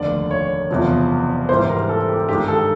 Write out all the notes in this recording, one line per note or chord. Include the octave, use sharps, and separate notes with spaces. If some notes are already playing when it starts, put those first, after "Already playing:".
Already playing: F1 D#2 D3 D5
C#5
F#1 E2 C3 F3
G#2 E3 G3 C5
A#4
A4
G4
G2 D#3 G#3 G4
A4